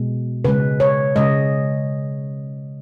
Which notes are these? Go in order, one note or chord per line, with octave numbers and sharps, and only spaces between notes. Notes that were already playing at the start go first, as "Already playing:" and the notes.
Already playing: B2 G#3
C#3 G#3 B4
C#5
C#3 G#3 D#5